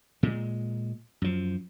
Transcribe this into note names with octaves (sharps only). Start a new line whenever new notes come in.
A#2 G#3
F#2 F3